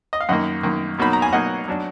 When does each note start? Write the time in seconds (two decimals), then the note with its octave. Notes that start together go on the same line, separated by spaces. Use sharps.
0.13 D#5
0.21 F5
0.29 F#2 D#3 A#3 D#5 F#5
0.63 F#2 D#3 A#3
0.98 B2 F#3 A#3 D#4 B5
1.13 A#5
1.22 G#5
1.33 B2 F#3 A#3 D#4 D#5 F#5
1.68 F#3 D4